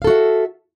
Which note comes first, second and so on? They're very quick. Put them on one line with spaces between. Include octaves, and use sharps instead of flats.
F5 A4 F#4 E5